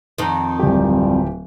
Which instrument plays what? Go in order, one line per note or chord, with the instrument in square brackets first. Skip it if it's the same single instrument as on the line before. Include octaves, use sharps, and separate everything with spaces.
[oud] F2 D#3
[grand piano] D1 G4 [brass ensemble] G3